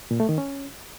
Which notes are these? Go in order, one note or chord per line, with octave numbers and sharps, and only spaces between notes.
A#2
A3
D#3
C#4